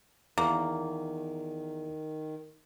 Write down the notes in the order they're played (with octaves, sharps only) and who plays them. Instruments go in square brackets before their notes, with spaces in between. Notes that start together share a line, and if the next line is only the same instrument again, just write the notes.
[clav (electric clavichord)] E2 [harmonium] D#3 [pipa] A#3